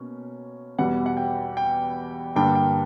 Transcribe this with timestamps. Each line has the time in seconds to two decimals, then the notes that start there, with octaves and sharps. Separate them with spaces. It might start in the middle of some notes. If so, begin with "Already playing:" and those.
Already playing: B2 A#3 C#4
0.78 E2 B2 G3 F#5
1.06 F#5
1.17 G5
1.57 G5
2.36 G2 D3 G3 A#3 D4 G5
2.55 G5